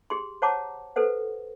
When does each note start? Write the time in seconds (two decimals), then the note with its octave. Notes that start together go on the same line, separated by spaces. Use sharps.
0.10 G4 G#4 C6
0.42 C5 C#5 F#5 A5 A#5 D6
0.96 G4 A4 B4 C5 F#5